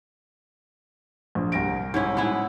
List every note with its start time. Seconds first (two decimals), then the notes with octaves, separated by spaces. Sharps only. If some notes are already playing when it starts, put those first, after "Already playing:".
1.35 A#1
1.52 C2 A#6 D7
1.94 G#2 C#4 E4
2.17 G#3 B3 E4